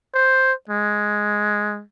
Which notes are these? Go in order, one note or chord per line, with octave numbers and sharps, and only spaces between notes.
C5
G#3